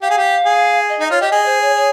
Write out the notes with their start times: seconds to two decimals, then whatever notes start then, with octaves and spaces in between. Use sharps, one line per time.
0.02 G4 F5
0.10 G#4
0.17 G4
0.45 G#4
0.89 D#5
1.00 D#4 D#5
1.11 F4 C#5
1.21 G4 D#5
1.32 G#4 D#5
1.46 C5
1.62 C#5
1.76 C#5